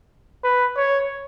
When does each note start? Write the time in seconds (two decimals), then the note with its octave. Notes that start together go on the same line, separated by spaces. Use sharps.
0.44 B4
0.77 C#5